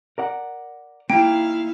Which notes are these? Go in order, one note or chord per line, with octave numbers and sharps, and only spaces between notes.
A#4 D5 F#5
A#3 D#4 E4 F5 G5